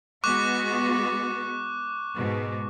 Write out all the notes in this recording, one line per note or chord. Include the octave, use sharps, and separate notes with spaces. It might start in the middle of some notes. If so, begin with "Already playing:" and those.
G#3 B3 F#4 C#6 D6 F#6
G#2 B2